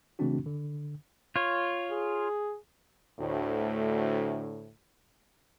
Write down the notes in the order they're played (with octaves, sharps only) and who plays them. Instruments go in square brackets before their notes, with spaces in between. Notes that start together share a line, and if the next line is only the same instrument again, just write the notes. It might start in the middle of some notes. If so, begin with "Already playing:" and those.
[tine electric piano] C#3 E3 A3 C4 D4 F#4
D3
[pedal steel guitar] F4 C#5
[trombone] G#4
[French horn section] D2 A2